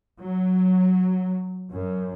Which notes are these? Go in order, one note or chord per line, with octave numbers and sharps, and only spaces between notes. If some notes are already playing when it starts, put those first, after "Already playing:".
F#3
F#2